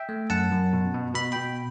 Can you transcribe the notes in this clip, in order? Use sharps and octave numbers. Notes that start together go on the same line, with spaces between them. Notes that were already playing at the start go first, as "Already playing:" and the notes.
Already playing: E5 G5
A3
F#2 F#5 A5
F#2
B2
B2
B2 B5
B2 G5 B5